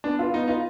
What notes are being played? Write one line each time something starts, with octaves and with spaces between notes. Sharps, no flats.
B3 D4
F4 B4
B3 D#4
D#4 F4 B4